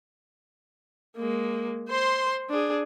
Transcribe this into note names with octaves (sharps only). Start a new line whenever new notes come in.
G#3 A#3
C5 C6
D4 G#4